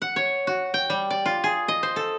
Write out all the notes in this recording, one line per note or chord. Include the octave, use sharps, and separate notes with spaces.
F#5
C#5
F#4
G5
G3
D5
F4
G#4
D#5
C5
A4